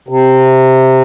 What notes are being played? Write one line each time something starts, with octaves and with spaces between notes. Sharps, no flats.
C3